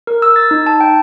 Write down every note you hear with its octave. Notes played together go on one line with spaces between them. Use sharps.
A#4
E6
A6
D#4
A5
G5